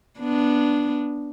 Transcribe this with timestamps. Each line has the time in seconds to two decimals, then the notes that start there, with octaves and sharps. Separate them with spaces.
0.20 B3 D4